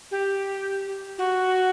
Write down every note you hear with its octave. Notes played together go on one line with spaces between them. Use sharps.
G4
F#4